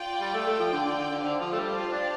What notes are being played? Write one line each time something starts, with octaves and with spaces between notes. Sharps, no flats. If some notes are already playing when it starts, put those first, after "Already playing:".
Already playing: F4 D5 G5
G3
A3
A3
F3
D3
D3
D3
D3
D3 G4 C5 F5 A5
F3
A3
G3
F4
D4